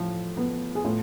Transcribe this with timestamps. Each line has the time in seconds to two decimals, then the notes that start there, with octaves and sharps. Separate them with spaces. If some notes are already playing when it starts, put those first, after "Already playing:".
Already playing: A2 F3
0.37 B3
0.75 G#4
0.84 A2 F4